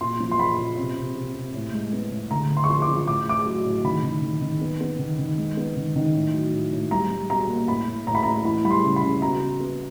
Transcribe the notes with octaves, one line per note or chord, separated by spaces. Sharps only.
A#2 C6
F3
C6
A#2 B5
A#2
C3
C3
C3
C3
A2
G#3
B3
A2
D3 A#5
D3
C6
C#6
F3 C6
D6
F3
A2 D6
A2 D6
F#3
A2
D#3 B5
D#3
D#3
D#3
B3
B3
D#3
D#3
G#3
B3
D#3
D#3
A2
F#3
A2
A2
G3 A#5
G3
B2 A#5
A#3
A2 B5
A2
A2 A#5
B5
A2 A#5
E3 B5
G3 B5
C6
C#3
B5
C#3
B2 A#5
B2
B3